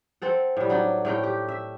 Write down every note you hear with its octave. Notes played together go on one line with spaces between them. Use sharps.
C4 A4 F#5
A2 G3
F#3 D4 D#4
A2 A3 A#4 G5
G4
E5